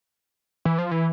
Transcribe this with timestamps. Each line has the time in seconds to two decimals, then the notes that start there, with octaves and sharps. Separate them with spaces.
0.65 E3
0.78 F3
0.91 E3